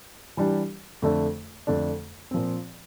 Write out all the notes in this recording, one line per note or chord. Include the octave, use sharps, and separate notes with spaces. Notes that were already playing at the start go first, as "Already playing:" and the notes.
E3 G3 D4 G4
F2 D3 A3 D4
F2 D3 A3 D4
A#2 F3 C4